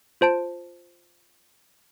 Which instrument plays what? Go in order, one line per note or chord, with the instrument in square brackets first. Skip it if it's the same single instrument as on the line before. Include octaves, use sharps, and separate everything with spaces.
[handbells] F4 C5 A5 D7